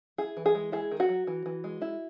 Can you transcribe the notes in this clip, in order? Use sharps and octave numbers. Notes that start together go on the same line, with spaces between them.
E4 G#4
E3
G#4
G#3
E4 G#4
D#3
F#4
F#3
E3
E3
G#3
E4